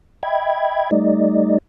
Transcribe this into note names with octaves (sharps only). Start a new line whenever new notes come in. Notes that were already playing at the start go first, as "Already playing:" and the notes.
D#5 E5 G5 B5 G#6
G3 A3 D#4 D5 D#5